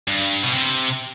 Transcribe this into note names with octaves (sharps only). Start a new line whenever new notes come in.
G2
B2
C3